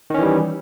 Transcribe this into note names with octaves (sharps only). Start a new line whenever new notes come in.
D#3 E3 G3 C#4